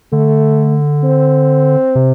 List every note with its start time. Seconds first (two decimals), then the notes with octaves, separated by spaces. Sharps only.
0.12 D3 A3
1.04 C4
1.95 C3